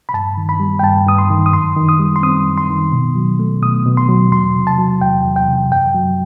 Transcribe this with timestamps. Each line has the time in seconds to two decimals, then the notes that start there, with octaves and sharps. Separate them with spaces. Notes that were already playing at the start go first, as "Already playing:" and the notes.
0.09 B5
0.14 G2 A5
0.37 D#3
0.49 B5
0.60 G3
0.79 G5
0.83 G2 A5
1.07 G2 D#6
1.18 C6
1.30 D#3
1.46 D#6
1.53 F#2 C6
1.77 D#3
1.89 D#6
1.99 G3
2.16 C6
2.23 C4 D#6
2.46 F#2
2.58 C6
2.70 D#3
2.92 B2
3.16 F#3
3.39 A3
3.62 B2 D#6
3.86 B2
3.97 C6
4.09 F#3
4.31 E2 C6
4.55 C3
4.67 A5
4.78 F#3
5.01 E2 G5
5.25 E2
5.36 G5
5.48 C3
5.72 F#2 G5
5.95 F#3